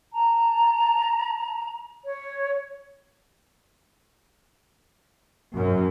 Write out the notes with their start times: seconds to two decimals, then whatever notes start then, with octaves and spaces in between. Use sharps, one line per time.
0.12 A5 A#5
2.05 C#5
5.54 F#2